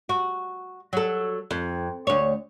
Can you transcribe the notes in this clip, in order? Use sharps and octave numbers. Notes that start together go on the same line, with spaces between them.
F#4
F#3 A4
F2
D2 C#5